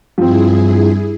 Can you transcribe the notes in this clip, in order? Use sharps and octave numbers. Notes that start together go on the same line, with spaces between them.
G2 F3 C4 E4 G#4